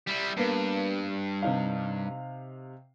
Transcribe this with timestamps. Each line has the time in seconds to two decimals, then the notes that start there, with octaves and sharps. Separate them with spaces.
0.07 G3 E4
0.37 G2 A#3 B3
1.43 C3 D#4 F5